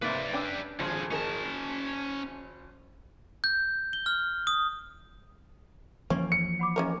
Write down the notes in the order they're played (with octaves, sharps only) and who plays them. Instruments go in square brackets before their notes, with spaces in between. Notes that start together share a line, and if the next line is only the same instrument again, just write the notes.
[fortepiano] G#2 C3 [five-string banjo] A#3 [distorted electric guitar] B4 D5
[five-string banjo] C#4 D4 [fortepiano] G5 D6 E6
[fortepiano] G#1 F3 C4 [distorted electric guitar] D3 G#4
[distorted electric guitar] C#4 A5 [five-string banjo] D#4 G#4 A#4
[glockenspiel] G6
G7
F6
D#6
[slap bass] E3 F3 A#3 [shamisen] C#4
[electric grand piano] C#7
[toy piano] F#5 B5 D6
[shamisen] G#3 C#4 A#4